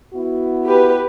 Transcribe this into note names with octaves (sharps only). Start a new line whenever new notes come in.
B3 E4 F#4
G4 B4